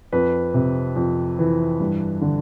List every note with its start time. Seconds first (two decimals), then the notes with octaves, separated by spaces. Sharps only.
0.12 F2 B4
0.54 C3
0.96 F2
1.39 E3
1.80 G2
2.22 D3